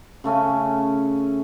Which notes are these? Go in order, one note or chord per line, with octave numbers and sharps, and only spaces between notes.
C#3 A3 C#4